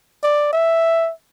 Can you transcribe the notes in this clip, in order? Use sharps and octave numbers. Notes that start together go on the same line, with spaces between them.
D5
E5